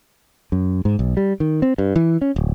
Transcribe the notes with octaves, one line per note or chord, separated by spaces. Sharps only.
F#2
G#2
B1
G3
D#3
C4
G2
E3
C#4
D1